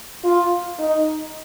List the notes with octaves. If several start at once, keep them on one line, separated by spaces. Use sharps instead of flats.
F4
D#4